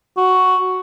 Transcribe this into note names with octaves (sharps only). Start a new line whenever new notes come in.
F#4